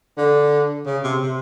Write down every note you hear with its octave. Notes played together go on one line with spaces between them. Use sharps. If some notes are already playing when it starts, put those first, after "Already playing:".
D3
C#3
C3
C3